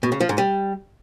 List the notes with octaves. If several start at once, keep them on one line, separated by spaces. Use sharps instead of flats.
B2
C#3
F3
G#2
G3